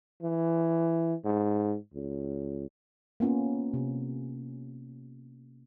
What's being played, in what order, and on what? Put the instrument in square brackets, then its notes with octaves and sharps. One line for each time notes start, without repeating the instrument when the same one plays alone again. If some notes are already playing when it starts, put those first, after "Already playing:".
[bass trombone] E3
G#2
C#2
[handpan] A#3 B3 C#4 F4
C3